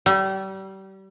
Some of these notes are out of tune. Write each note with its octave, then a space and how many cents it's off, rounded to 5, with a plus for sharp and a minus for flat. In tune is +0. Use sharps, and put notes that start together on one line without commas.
G3 -30